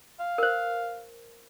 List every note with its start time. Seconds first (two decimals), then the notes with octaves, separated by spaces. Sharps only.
0.20 F5
0.38 A#4 C5